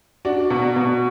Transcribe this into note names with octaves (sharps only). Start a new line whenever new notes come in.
D4 F#4
B2
B2